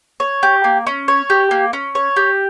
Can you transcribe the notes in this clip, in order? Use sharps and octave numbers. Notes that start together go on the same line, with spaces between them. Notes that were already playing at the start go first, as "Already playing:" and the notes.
C#5
G4
A#3
C#4
C#5
G4
A#3
C#4
C#5
G4